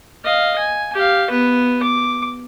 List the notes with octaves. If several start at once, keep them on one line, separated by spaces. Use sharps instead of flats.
D#5 F5
G#5
G4 F5
B3 B4
D6